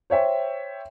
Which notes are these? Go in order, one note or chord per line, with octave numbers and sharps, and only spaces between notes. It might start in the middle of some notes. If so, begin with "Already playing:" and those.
C5 C#5 E5 G5